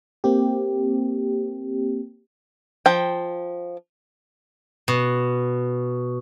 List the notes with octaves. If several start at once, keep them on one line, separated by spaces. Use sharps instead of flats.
A#3 C4 G4
F3 G5
B2